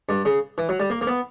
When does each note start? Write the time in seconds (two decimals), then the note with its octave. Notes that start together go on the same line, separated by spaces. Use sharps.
0.09 G2
0.25 C#3
0.58 E3
0.69 F#3
0.80 G3
0.90 A#3
1.01 A#3
1.07 B3